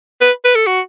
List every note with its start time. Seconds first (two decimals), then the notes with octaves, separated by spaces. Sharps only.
0.21 B4
0.45 B4
0.55 A4
0.67 F#4